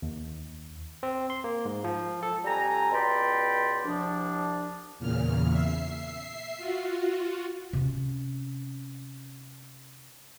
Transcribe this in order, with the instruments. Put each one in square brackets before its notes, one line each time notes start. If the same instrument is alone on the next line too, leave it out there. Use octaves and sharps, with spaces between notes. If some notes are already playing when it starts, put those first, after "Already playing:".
[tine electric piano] D#2
C4
C6
A#3
G#2
F3
A4
[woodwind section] F2 G3 G#5 A#5
C#2 B2 D5 G5 B5 C6
C2 F3 D4
[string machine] E2 A#2 C#3 F6
E5 C7
F4 F#4
[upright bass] C3 C#4